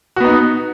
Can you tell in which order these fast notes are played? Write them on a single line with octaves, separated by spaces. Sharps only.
F#4 B3 D#4